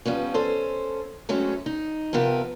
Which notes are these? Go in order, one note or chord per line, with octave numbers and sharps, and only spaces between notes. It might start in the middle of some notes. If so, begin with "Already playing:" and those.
F3 G3 B3 C#4
C#4 A4 C5
F#3 G#3 A3 C4 C#4
D#4
C3 F3 B3 A#4 G5